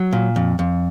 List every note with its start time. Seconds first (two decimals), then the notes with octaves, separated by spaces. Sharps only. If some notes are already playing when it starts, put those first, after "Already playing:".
Already playing: F#3
0.13 A#2
0.36 F2
0.59 F2